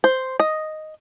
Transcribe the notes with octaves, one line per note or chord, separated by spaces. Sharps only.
C5
D#5